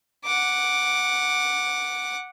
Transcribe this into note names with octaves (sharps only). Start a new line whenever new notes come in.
F#5 D6